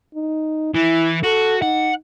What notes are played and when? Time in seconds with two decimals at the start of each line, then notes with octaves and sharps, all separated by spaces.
0.15 D#4
0.74 E3 E4
1.24 F#4 A4
1.62 D#4 F#5